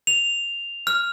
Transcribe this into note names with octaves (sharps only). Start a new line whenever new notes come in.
F7
F6